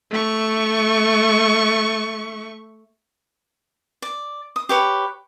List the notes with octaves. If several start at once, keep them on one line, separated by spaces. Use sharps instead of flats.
A3 C#6
D5
D#6
G4 B4 C#5